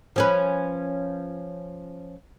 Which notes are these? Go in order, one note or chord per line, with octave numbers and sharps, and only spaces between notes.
F3 C#4 B4